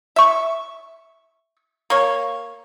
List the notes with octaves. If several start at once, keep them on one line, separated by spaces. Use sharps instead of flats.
E5 C#6
A#3 C#5